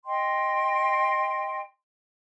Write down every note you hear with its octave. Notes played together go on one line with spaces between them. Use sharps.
D#5 G5 C6